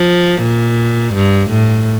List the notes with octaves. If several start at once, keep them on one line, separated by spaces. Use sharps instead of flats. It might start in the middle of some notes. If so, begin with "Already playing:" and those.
Already playing: F3
A#2
G2
A2